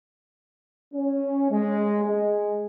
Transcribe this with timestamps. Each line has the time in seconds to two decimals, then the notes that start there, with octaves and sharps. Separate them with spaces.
0.94 C#4
1.50 G#3
2.04 G#3